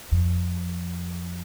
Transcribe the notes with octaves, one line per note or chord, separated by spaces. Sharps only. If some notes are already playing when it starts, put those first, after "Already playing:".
F2